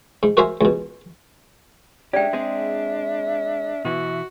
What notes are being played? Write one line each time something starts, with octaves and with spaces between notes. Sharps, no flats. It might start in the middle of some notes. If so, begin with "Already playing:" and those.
G#2
F#4 A#4 C5 E5 F5 G#5
C#2 B2
G#3 C#4 D4 G4 D5 E5 G5
G#3 C4 G#4
B2 E3 F#4